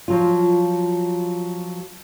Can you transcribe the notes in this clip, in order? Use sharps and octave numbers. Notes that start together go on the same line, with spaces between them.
F3 F#3 F4